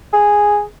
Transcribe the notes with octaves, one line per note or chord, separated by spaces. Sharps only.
G#4